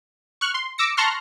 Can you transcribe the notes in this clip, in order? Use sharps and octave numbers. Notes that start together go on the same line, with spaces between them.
C#6 F6 F#6
C6
D6 E6 A#6 C#7
A5 A#5 C6 C#6 F6 F#6